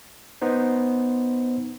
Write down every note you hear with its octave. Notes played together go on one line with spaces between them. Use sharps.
B3 D#4 C5